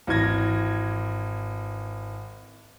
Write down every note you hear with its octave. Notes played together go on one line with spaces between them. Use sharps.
G#1 E3 G#6 A#6